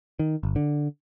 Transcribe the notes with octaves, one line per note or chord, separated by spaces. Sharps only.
D#3
G1
D3